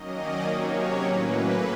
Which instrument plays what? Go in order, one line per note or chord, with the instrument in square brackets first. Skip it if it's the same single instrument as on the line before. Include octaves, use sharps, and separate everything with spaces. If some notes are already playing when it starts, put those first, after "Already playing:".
Already playing: [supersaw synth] D#3 F#3 A#3 C#4 D#5
D5
C3 D#3 F#3 A#3 C#4 C#5
A2 F#3 A#3 C#4 B4